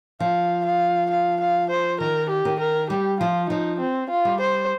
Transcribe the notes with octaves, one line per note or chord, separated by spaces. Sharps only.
F3 F5
F5
F5
F5
C5
D#3 A#4
G4
D#3
A#4
G3 G4
F3 F4
F3 D#4
C4
F4
G3
C5